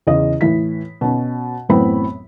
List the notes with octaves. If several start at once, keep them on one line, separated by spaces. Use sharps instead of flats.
E2 C#3 D#5
A2 E3 B6
B2 C#4
A1 F#2 A2 B3 C4 B5